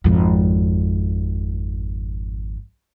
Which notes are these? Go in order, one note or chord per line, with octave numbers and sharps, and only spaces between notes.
G#1 F2